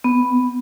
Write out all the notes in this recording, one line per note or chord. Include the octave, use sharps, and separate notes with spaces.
B3